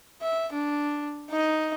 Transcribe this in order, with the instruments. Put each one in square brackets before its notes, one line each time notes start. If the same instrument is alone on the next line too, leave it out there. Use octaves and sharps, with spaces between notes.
[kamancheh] E5
D4
D#4 D#5